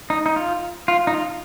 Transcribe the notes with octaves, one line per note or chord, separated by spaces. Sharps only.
D#4
D#4
F4
F4
D#4
F4